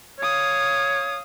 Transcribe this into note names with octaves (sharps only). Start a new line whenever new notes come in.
C#5 F5 D#6